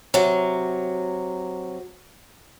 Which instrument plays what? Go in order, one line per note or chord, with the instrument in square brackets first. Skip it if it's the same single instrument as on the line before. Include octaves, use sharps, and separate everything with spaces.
[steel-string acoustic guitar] C3 F#3